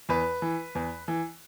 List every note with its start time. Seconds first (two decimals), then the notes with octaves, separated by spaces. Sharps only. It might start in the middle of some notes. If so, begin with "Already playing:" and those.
0.09 E2 B4
0.42 E3
0.75 E2
1.08 E3